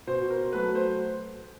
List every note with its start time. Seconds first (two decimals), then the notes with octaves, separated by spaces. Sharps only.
0.07 B2 C5
0.30 A#4
0.53 F#3 A3 B4
0.75 C5